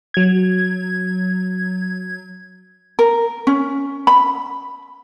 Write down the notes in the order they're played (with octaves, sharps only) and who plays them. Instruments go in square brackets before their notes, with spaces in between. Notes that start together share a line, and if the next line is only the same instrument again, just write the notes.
[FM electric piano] F#3 G#6
[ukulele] A#4
C#4
B5